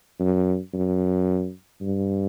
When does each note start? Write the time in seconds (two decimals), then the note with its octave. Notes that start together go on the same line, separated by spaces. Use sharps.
0.19 F#2
0.74 F#2
1.81 G2